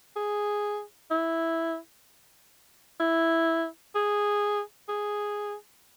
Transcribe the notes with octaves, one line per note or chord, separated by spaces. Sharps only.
G#4
E4
E4
G#4
G#4